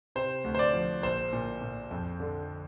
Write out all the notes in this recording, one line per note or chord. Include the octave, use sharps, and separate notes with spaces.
C3 C5
D2
C5
D5
F3
A#1 C5
A#2
A#2
F2
D3